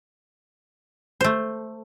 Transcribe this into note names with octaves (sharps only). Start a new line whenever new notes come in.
A3 C5